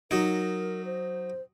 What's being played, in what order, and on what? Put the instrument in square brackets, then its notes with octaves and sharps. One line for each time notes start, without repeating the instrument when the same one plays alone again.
[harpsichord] F#3 D#4 [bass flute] A#4
[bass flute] C5